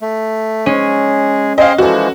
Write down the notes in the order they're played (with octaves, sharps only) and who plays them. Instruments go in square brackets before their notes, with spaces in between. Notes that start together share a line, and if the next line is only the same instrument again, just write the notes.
[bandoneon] A3
[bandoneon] G#3 G#4 [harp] C#4
[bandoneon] G#4 C5 G5 [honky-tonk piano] D#5 F5
[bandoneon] E3 F3 G#3 [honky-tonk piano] F#4 A4